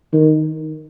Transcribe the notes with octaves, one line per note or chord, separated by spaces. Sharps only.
D#3